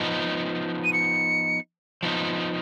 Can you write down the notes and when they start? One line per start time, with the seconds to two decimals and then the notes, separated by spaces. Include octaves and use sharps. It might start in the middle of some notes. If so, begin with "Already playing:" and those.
Already playing: F3 B3 D#4
0.84 D#7
0.93 C#7
2.03 F3 B3 D#4